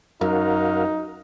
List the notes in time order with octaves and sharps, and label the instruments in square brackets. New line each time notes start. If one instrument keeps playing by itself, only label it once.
[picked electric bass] F#2 [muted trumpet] D#4 [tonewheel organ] F#4 A#4 F5